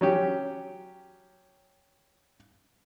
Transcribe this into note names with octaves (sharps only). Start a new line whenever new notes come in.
F#3 C#4 G4